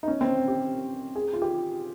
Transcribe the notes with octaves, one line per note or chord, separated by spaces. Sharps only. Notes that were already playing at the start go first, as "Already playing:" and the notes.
D#4
C#4
C4
G4
G#4
F4
G4